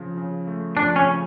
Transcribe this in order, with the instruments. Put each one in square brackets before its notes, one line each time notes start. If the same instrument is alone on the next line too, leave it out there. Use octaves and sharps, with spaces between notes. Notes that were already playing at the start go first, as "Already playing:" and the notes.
Already playing: [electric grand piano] C#3 F3
C#3
A3
[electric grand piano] F3 [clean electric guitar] D4
[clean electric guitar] C#4
[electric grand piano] C#3